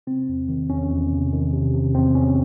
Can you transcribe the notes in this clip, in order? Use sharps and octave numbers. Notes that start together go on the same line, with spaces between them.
C3 C4
E2
D#3
E2 C#4
E2
C3
D#3
C3
C3
E2 C4
E2 C#4